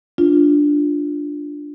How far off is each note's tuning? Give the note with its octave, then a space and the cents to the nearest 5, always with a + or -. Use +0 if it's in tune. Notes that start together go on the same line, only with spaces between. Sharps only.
D4 +0 F4 +0